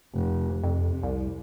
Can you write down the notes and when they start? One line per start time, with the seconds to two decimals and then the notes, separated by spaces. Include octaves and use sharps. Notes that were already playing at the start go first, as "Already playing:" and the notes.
0.14 F1
0.63 F2 C3
1.03 C2